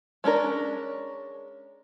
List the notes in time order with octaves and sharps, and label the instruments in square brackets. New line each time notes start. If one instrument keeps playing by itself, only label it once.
[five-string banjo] G#3 C#4 D4 A#4